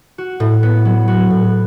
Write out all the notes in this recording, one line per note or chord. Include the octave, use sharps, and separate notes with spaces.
F#4
A2
B3
F#3
F#4
A2